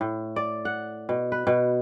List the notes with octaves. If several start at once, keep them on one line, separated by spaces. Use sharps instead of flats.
A2
D5
F#5
B2
B4
B2